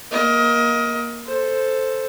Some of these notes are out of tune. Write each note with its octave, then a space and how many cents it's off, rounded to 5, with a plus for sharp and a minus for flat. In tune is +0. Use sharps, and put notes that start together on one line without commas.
A#3 +20 D#5 +25
A4 +0 C5 +0